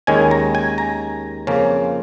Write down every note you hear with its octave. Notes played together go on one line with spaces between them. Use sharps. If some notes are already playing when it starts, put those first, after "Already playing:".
D#2 D#3 G#3 C#4 G#5
A#5
G#5
A#5
F2 C#3 F3 A#3 C#4